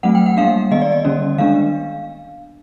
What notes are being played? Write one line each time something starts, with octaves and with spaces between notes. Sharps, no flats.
F#3 A3 C4 F#5
G5
F#5
G3 A#3 D4 F5
D#3 G#3 B3 D#5
D5
D#5
D3 G3 A#3 C#4
D#3 G#3 B3 D4 F5